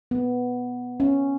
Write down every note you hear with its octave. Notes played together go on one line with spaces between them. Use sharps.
B3
C#4